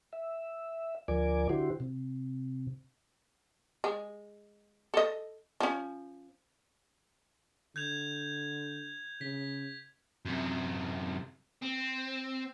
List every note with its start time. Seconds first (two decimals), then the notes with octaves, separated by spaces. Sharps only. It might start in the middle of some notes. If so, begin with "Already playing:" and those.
0.13 E5
1.08 D2 F3 A#4 D5 G#5 D6
1.49 D3 E4 F#4 G4 C5
1.80 C3
3.84 G#3
4.94 A4 D#5
5.60 F3 C#4
7.76 D3 G6 G#6 F7
9.21 C#3 B6
10.25 F#2 C3
11.62 C4